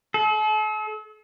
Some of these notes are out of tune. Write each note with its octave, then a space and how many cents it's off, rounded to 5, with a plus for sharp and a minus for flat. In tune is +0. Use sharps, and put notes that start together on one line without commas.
A4 -45